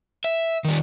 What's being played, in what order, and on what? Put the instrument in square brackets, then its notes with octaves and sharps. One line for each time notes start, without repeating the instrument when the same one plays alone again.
[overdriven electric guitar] E5
D#3 G3